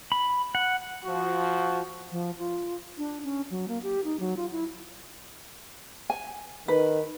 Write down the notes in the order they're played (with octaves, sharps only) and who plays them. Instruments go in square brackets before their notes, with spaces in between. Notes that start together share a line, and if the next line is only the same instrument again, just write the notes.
[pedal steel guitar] B5
F#5
[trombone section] F3 F#4
[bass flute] F3
F4
D4
C#4
F#3
A#3
G4
D#4
F#3
F4
E4
[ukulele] G#5
[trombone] D#3 [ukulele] B4